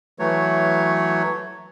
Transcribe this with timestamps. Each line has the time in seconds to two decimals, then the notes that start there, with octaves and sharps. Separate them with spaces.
0.19 E3 F#3 A3 C#5